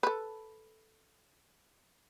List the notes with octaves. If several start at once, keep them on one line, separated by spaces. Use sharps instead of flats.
A4 B4